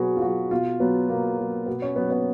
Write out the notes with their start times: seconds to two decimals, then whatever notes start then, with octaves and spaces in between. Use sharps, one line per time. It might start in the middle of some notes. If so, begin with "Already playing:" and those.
Already playing: B2 F#3 F#4 G#4 B4
0.17 F4
0.22 F#3 F#4
0.51 B2 F4
0.80 F#3 B3
1.08 B2 A#3
1.38 F#3
1.66 B2 B3
1.82 C#4
1.96 F#3 B3
2.11 B3